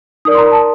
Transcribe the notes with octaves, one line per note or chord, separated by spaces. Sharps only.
D#4 A#4 D5 D#6
C6
A#5
A5